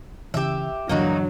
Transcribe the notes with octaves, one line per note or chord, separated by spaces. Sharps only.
C#3 E3 G4 E5
G2 D3 E3 F#3 A#3 D4 D#4 F#4